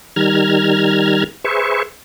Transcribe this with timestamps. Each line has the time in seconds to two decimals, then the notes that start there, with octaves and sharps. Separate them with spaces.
0.16 D#3 G3 A#5 F6 G#6
1.44 G#4 B4 C5 E5 C#6